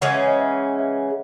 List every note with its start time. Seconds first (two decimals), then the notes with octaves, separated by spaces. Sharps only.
0.01 C#3 E3 G#3 C#4 F#5
0.14 E5
0.28 D#5
0.40 C#5 E5
0.78 C#5 E5